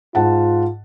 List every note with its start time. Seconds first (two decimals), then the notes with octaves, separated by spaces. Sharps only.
0.15 G#2 F4 F#5 A5